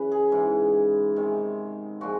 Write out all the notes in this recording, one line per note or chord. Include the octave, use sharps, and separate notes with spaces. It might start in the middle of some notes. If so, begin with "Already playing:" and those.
Already playing: F#2 C#3 E3 B4
G#4
G#2 E3 G#3
C3 D#3 G#3
A#2 F3 G#3 F#4